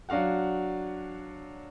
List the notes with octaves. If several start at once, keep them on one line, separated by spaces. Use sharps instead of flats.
F#3 D4 F#4 F5 F#5